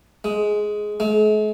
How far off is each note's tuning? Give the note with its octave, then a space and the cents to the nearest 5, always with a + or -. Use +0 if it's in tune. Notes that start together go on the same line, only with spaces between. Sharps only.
G#3 +10
G#3 +45